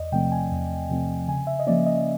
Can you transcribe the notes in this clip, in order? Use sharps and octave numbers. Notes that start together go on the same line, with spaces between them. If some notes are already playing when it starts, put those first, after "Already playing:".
Already playing: E2 D5 D#5
C3 F3 A3 C4 G5
G#5
E2
C3 F3 A3 C4
C#3 G#5
E5
D#5
F3 A#3 C#4 D5
D#5